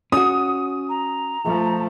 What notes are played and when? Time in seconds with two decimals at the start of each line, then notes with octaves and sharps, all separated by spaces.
0.12 C#4 F#4 D#6
0.89 A#5
1.45 F3 A3